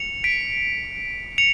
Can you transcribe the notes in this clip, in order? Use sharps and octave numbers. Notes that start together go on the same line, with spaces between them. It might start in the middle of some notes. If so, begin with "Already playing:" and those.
Already playing: C#7 F7
B6 D7
C#7 F7